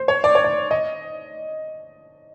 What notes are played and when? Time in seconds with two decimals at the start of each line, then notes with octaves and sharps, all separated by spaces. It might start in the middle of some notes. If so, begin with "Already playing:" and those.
Already playing: C5
0.08 C#5
0.24 D5
0.35 C#5
0.44 D5
0.71 D#5